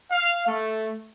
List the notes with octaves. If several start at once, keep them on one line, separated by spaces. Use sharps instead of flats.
F5
A3